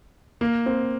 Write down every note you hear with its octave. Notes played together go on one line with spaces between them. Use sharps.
A#3
C4